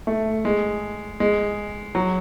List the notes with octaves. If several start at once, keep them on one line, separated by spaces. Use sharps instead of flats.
A3
G#3
G#3
F#3